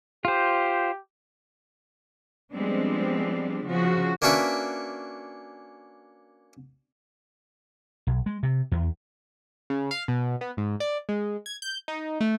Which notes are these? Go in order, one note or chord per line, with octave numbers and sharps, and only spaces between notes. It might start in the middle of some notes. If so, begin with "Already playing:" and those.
F4 G4 C5
F3 G3 G#3 B3 C4 D4
C#3 F3 F#4
A#3 C#4 D4 F#4 B4 E5
B1
G#3
C3
E2
C#3
F5
B2
B3
G#2
D5
G#3
G#6
G6
D#4
A3